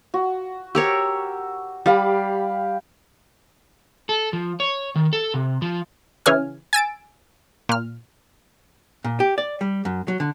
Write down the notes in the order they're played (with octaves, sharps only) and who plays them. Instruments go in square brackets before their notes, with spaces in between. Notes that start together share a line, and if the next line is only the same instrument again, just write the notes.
[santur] F#4
[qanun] G4 A#4 C#5 [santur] E6
[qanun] G3 [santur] G4 F5 B5
[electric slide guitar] A4
F3
C#5
D#3
A4
C3
F3
[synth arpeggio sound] C#3 E3 G#4 C#5 G#5 F6
G#5 E6 A6 D7
A#2 F6
[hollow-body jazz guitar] A#2
G4
D5
G3
F#2
F#3
D3